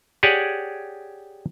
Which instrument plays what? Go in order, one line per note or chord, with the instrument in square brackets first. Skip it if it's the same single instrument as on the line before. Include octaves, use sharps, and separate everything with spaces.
[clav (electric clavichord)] G4 G#4 C#5 D5 F#5 G#5